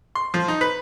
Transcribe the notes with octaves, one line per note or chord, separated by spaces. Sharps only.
C6
F3
D#4
B4